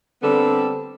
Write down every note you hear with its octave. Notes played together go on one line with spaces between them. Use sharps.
D3 G3 B3 C4 A4